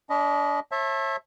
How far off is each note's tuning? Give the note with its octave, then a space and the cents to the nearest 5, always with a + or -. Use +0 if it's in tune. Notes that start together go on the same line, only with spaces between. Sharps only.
D4 -35 D#5 +0 B5 +0
C#5 -40 E5 +0 A5 +0